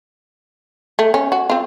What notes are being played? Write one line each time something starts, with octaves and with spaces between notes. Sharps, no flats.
A3
C#4
F#4
C4 F4